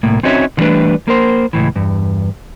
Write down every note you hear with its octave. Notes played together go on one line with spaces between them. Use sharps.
C2 A2 A#3
C4 C#4 D#4 F#4 C#5 E5
D3 E3 G3 A3 D4 B4
A#3 A#4 C5
C#2 A2 E3
E2 G2